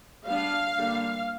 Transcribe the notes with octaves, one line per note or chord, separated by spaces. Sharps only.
G3 B3 D4 F5
D3 G3 A#3 D4